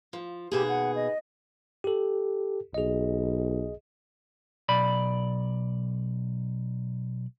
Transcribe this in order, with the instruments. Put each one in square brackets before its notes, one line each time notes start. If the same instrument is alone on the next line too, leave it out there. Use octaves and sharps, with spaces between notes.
[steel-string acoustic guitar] F3
[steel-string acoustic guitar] D#2 B2 G#4 [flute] G4
[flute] F#5
D#5
[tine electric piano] G4 A4
[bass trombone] B1 [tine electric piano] G#4 D#5
[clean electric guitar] B1 D5 B5